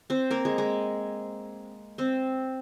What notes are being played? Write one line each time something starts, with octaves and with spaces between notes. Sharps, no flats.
C4 C5
A#3 A#4
G#3 G#4
G#3 G#4
C4 C5